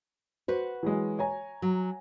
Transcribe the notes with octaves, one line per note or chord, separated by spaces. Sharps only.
F#4 B4 C5
E3 F#3 G#3
C#5 G#5 A#5
F#3